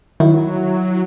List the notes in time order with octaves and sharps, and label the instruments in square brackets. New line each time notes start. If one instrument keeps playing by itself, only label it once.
[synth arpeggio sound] D#3 [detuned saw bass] F#3 [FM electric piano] E4